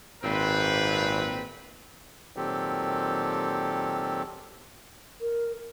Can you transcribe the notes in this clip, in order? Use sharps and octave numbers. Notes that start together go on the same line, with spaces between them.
G#1 A#2 C4 B4
A#2 D#3 F#3 C4 G4 A4
A#4